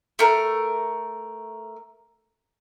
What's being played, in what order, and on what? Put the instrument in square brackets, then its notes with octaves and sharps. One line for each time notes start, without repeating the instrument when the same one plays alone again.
[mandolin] A3 A#4